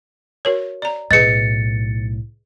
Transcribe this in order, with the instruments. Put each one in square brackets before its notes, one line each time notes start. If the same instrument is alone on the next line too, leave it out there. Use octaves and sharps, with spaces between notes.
[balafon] F#4 A#4 C#5
D5 A#5
[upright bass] B1 A2 [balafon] G#4 B4 D#5 [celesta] A6 C#7